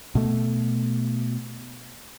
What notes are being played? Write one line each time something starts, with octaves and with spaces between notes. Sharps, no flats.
B2 A3